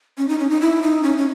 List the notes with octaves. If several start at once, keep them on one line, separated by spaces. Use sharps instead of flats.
C#4
D#4
C#4
D#4
E4
D#4
C#4
C#4